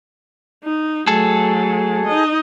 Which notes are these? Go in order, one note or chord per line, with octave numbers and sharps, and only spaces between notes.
D#4
F#3 A3 G#4 A4
D#4 D#5